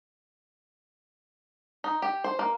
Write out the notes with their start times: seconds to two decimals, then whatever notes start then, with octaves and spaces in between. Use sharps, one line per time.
1.84 D#4
2.02 G4
2.24 C5
2.39 A#3